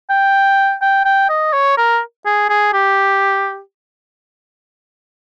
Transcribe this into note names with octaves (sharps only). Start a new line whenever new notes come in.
G5
G5
G5
D#5
C#5
A#4
G#4
G#4
G4